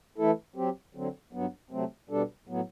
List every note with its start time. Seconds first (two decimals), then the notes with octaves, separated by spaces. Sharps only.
0.18 E3 A3 E4 A4
0.56 F#3 C4 G4
0.95 D3 F#3 C4
1.33 G2 F#3 B3
1.71 C3 F#3 A3 C4
2.09 B2 G3 D4 A4
2.47 A2 F#3 B3